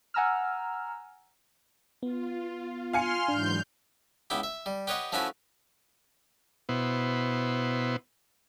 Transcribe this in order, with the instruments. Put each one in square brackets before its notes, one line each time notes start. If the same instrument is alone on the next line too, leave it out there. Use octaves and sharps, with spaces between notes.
[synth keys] F#5 G#5 A#5 E6 F6
[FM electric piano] B3 [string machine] F4
[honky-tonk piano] F5 G#5 C#7 [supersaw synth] C6 F6
[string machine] G#2 E3 F#3 [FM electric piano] D4 [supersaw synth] G6
[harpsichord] C#2 B3 E4 G4
E5
G3
G4 B4 C#5 D#5 F#5
F3 A3 C#4 E4 F#4 B4
[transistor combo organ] B2 B3 E4 C5